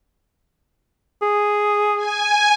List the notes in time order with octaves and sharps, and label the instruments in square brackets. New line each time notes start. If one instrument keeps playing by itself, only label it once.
[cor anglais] G#4
[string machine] G#5